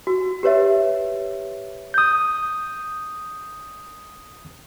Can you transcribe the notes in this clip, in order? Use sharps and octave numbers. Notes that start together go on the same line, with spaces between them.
F#4
G4 B4 C#5 E5
D#6 G6